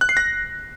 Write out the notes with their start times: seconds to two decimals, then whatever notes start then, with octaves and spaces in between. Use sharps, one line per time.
0.01 F#6
0.09 C7
0.17 A#6